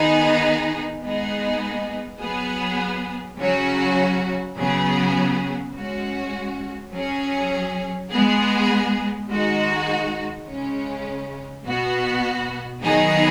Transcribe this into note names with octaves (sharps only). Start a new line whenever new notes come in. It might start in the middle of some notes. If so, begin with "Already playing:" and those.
Already playing: D#3 B3 D#4 G#4
G#3 B3 D#4 G#4
F#3 B3 G#4
C#3 F#3 C#4 F#4
C#3 F#3 B3 G#4
G#3 C#4 F#4
F#3 C#4 G#4
G#3 B3 G#4
D#3 G#3 D#4 F#4
C#3 G#3 C#4
B2 B3 F#4
D#3 F#3 B3 D#4 G#4